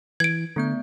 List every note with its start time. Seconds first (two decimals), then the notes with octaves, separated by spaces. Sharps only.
0.20 E3 G#6 D7
0.56 D3 A3 B3 G6